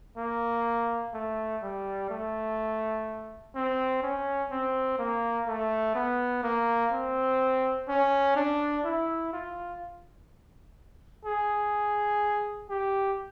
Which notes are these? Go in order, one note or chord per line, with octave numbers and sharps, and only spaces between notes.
A#3
A3
G3
A3
C4
C#4
C4
A#3
A3
B3
A#3
C4
C#4
D4
E4
F4
G#4
G4